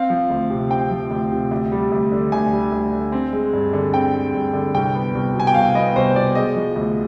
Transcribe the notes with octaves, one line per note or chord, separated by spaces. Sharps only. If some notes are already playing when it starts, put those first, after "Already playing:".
Already playing: C4 F5
F3
D2
C3
C4 G5
F3
D2
C3
D2
G3
D2
D3
D2 G#5
G3
D2
D3
C4
G#3
G2
D3
C4 G5
G#3
G2
D3
C2 G5
B3
C2
B2
G#5
G5
C2 F5
B3 D#5
C2 C5
B2 D5
G#3 D#5
F3
D2